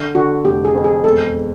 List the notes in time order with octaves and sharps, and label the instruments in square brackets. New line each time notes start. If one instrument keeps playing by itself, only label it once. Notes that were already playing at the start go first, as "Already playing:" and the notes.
Already playing: [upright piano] D3
[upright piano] D3 [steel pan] F#4
[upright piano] F1 [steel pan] G4
[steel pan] G#4
[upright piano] F2
[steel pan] G#4
[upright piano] E1 [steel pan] A4